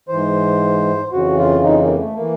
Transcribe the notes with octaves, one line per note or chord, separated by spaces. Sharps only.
G#2 E3 C5
F2 C#3 E3 F#4
F4
D#4
A#3
A3
E3 A#3